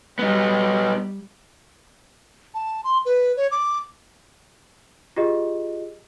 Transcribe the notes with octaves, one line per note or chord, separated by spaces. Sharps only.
G3 B3 D#4
A5
C6
B4
C#5
D6
F4 G4 G#4 D#5